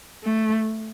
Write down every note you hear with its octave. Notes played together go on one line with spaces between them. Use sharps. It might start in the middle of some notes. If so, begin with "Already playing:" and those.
A3